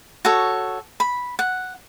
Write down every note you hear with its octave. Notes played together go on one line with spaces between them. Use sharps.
F#4 A4 C#5
B5
F#5